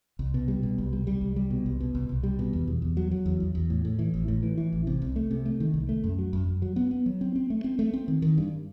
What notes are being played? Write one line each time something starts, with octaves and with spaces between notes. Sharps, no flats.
C2
B2
G3
B2
C2
G3
G3
C2
G3
B2
C2
B2
C2
C2
G3
B2
E2
E2
E2
F#3
F#3
E2
E2
E2
A2
A2
E3
A1
A2
E3
E3
A1
C3
C2
A3
C3
A3
D#3
C2
A3
F#2
F#3
F#2
F#2
F#3
B3
B3
F#3
C4
C4
A3
C4
A3
C4
D#3
D#3
G2